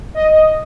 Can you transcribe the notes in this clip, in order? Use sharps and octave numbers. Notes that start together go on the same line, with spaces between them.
D#5